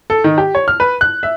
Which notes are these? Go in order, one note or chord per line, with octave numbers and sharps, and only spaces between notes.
A4
D#3
G4
C#5
F6
B4
F#6
E5